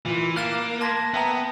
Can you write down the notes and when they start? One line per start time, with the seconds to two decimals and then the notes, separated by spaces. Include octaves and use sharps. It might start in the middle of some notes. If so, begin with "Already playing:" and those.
0.05 A#2 E3
0.36 A#3 F5 F6 F#6 A6 E7
0.81 A5 C6 G#6 A#6 B6
1.14 B3 E5 G5 A#5